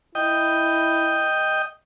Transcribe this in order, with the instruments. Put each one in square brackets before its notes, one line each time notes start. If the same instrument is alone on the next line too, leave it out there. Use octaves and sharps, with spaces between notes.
[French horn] E4 [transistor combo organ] D#5 G5